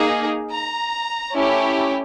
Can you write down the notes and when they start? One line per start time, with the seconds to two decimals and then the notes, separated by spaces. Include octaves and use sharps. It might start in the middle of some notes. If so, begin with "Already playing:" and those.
Already playing: A#3 D#4 G#4
0.50 A#5
1.33 A3 C#4 E4 G4